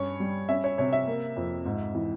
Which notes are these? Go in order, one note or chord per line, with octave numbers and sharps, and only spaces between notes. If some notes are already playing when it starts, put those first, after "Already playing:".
Already playing: G2 C#4 C#5
G3
C#4 E5
C#5
C3 C#5
E5
A#3
F2
G#2
E3